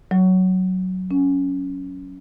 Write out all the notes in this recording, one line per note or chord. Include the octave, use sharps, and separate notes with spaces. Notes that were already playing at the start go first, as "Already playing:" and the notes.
F#3
C#4